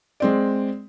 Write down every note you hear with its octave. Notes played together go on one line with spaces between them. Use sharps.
G#3 C4 D5